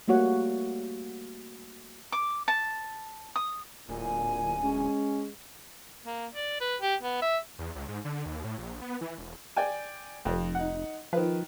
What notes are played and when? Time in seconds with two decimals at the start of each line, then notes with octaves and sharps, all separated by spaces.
0.08 G3 A3 A#3 F#4 C#5 F#5
2.12 D6
2.48 A5
3.36 D#6
3.89 D1 A#2 G#5
4.63 G#3 C#4
6.06 A#3
6.34 D5
6.61 B4
6.81 G4
7.02 B3
7.22 E5
7.59 E2
7.75 C#2
7.88 G#2
8.05 D3
8.26 D#2
8.44 A2
8.58 A#1
8.82 B3
9.01 E3
9.18 E1
9.56 D5 G5 G#5
10.25 F1 F2
10.55 D#4 F#5
11.13 D#3 F3 B4